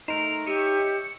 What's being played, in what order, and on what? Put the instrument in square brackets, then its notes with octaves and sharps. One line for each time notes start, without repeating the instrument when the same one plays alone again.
[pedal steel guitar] A3 A#4 C5 [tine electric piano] D#4 [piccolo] F7
[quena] G4 [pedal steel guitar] C#5 D#5 E5 [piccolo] C#7